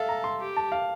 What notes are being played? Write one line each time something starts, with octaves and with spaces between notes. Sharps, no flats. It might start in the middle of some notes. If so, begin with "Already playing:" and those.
Already playing: A4 E5 F5
A#5
C6
G4
A5
F5